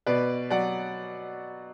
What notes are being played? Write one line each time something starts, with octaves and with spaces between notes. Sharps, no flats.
B2 B4 D5
F#3 D5 F#5